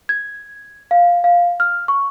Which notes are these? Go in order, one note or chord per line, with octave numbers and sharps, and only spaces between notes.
G#6
F5
F5
F6
C#6